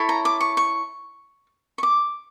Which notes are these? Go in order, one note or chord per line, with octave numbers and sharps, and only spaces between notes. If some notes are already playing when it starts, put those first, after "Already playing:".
Already playing: E4 A4 C#5
A#5
D6
C#6
C#6
C#6
D6